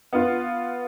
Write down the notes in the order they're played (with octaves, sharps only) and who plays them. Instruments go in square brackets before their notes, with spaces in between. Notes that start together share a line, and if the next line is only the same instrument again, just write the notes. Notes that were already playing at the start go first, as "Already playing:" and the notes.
[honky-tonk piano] B3 F4